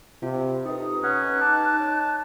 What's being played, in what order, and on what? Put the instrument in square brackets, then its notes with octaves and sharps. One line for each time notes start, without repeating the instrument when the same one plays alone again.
[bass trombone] C3 [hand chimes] F4
[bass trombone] D#4 [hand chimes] G4 A4 B4 [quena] D#6
[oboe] C#4 [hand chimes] B4 F#5 C#6 [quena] F#6
[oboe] A5 [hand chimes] D6
[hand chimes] C#5